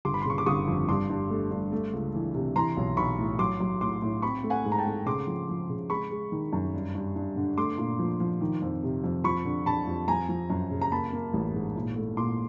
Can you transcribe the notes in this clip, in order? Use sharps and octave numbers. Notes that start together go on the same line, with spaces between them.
G1 C6 D6
B5
C6
C#3 C#6
D6
G1 C#6 D#6
F2
G2 C6 D6
G2
A3
G2
A3
C#2
E3
C3
E3 A#5 C6
B1
B1 B5 C#6
A2
F#3 C6 D6
F#3
A2 C6 D6
A2
C4 B5 C#6
A3
F#5 G#5
G#2
A#5
G5 A5
A3
C#3 C6 D6
F3
F3
C#3
G#3 B5 C#6
G#3
D#3
F#2
G2
G2
G2
D3
A3 C6 D6
A#2
F3
F3
D#3
F2
C3
F2
F3 B5 C#6
D3
D3 A5 B5
F2
F3 G#5 A#5
F3
F#2
C#3
A#5
A#3 A5 B5
A#3
A1
G#2
A#2
A3
A#2 C6 D6